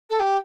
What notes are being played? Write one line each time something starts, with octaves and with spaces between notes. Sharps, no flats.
A4
G4